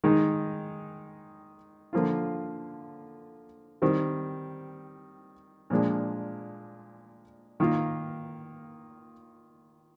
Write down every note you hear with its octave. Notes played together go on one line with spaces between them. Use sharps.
D#3 G#3 D#4
D3 F3 A#3 F4
D#3 G3 C4
A#2 F3 G#3 D4
D#3 A#3 F4